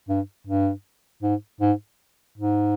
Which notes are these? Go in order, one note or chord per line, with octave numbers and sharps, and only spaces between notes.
G2
G2
G#2
G#2
G#2